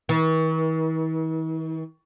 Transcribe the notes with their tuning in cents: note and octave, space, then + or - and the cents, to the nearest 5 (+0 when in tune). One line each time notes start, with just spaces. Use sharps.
E3 -45